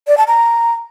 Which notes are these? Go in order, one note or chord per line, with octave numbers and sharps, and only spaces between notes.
D5
A5
A#5